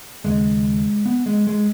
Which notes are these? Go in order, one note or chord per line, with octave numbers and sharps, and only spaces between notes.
D#2 C#3 G#3
B3
G#3
G#3